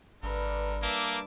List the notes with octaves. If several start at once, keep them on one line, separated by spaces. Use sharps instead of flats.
G#1 G2 D3 A#4 B4
A#3 E5 A5 D6